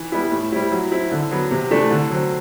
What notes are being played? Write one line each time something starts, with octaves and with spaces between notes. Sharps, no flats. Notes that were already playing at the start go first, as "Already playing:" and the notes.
Already playing: E3
G3 B3 E4
A2
G3 C4 E4
F#3
C4 E4
D3
F#3 B3
C3
E3 A3 D4
D3
F#3 C4